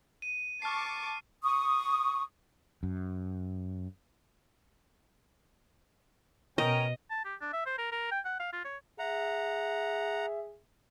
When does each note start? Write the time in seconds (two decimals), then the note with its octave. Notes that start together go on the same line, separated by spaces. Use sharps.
0.22 D#7
0.62 A5 C#6 D6 F6 C7
1.43 C#6 D#6
2.83 F#2
6.58 B2 C#4 A#4 D#5 G5
7.10 A5
7.25 G4
7.41 D4
7.53 E5
7.66 C5
7.78 A#4
7.92 A#4
8.11 G5
8.25 F#5
8.39 F5
8.53 F4
8.65 C#5
8.99 G#4 E5 F#5 A#5